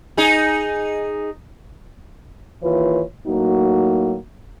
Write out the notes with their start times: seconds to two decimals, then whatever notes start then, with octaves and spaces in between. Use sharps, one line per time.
0.17 D#4 G#4
2.63 D#2 E3 F4 B4 C#5
3.26 A2 F#3 A#3 D#4 F#4